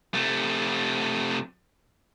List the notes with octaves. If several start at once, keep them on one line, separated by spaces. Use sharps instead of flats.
C3 A3